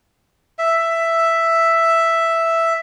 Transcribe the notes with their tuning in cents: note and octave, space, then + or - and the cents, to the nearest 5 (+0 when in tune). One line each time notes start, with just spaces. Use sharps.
E5 +5